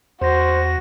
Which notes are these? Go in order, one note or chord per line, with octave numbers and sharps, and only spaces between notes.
E2 F#4 C5 A#6